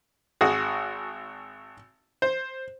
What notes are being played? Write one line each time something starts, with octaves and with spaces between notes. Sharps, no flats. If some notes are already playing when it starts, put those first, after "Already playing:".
G#1 F#4 G#4
C5